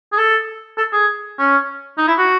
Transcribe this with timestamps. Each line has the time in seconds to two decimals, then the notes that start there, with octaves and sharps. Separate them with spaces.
0.13 G#4
0.18 A4
0.78 A4
0.93 G#4
1.39 C#4
1.98 D#4
2.08 E4
2.18 F#4